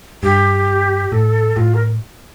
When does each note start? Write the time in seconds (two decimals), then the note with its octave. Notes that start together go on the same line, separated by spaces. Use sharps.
0.23 G2 G4
1.12 A2 A4
1.56 A2 F4
1.74 A#4